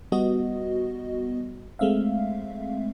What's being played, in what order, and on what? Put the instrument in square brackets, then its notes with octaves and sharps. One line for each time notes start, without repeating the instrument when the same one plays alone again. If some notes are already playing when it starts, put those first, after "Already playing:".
[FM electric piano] G3 B3 F#4 D#5
G#3 A3 C4 E5 F5